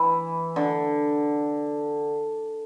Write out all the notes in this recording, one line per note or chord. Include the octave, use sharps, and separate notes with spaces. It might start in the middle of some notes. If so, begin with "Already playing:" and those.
Already playing: E3
D3